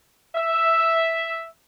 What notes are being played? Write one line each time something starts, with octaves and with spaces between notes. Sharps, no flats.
E5